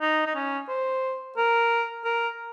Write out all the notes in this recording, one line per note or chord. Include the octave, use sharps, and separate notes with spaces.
D#4
D#4
C#4
C5
A#4
A#4